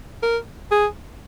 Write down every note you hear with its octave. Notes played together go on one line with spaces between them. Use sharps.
A#4
G#4